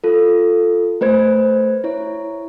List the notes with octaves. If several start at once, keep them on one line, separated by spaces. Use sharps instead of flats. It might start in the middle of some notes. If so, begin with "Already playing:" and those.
F4 A4
A3 B4 C5 G#6
E4 C#5